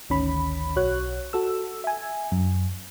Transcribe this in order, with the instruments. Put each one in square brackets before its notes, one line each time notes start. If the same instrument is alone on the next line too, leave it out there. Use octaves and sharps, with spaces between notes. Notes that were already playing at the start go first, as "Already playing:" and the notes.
[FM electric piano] G#1 D2 D#3 C#4 B5
B1 F#4 C#5 F#6
F#4 A4 E6
E5 G#5
F#2